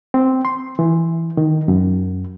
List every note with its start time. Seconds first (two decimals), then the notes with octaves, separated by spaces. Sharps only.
0.14 C4
0.45 C6
0.79 E3
1.37 D#3
1.68 F#2